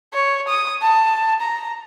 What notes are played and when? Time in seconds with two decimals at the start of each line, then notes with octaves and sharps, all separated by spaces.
0.14 C#5
0.48 D#6
0.82 A5
1.41 A#5